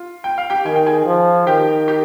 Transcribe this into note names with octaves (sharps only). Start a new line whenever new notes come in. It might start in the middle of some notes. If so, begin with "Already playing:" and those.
Already playing: F4
G5
F5
G4 G5
D#3 G#5
G5
G#4 G#5
F3
D#3 G4 G5
G4 G5